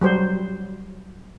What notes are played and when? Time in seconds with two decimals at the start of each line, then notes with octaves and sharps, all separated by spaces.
0.01 F#3 G3 C5